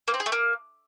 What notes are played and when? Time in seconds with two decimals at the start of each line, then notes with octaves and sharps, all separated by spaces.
0.08 A#3
0.14 C4
0.20 G#4
0.26 A3
0.32 A#3